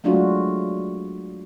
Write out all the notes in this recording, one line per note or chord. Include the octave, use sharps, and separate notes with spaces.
F#3 G#3 A3 D4 F4 F#4